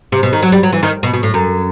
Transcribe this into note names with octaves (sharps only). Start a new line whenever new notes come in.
C3
B2
D#3
F#3
G3
F#3
E3
D#3
B2
B2
A2
F#2